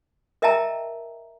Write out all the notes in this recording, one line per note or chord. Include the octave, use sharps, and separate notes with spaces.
A#4 D#5 E5 G5 A5 A#5